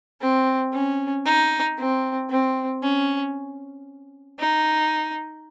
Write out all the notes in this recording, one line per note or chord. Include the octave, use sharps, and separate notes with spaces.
C4
C#4
D#4
C4
C4
C#4
D#4